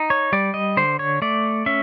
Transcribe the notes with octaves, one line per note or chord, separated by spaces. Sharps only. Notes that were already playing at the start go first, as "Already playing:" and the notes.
Already playing: D#4
C#5
G3 D5
D#5
D3 C5
C#5
A3 D5
C#4 E5